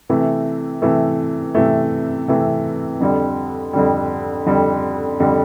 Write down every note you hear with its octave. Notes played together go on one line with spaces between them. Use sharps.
C3 E3 A3
C3 E3 A3
C3 E3 A3
C3 E3 A3
F2 D3 G3
F2 D3 G3
F2 D3 G3
F2 D3 G3